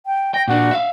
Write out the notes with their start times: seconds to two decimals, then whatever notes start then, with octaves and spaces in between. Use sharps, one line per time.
0.06 G5
0.34 G5 A#6
0.48 A#2 D4 F#4
0.71 E5 F5